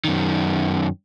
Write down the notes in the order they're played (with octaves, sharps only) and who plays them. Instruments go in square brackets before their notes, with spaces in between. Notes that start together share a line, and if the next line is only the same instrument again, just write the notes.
[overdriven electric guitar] F#2 D#3